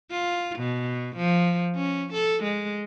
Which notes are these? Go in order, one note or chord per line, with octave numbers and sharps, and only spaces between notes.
F4
B2
F3
C#4
A4
G#3